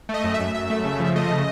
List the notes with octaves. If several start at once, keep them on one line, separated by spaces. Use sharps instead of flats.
A3
D#5
F#2
E5
F#2
F#2 E5
A3
C#3
F3
A3 D#5
C#3